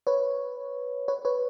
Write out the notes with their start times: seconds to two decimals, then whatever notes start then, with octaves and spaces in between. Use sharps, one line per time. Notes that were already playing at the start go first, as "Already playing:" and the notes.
0.07 B4 C#5
1.08 B4 C#5
1.25 B4 C#5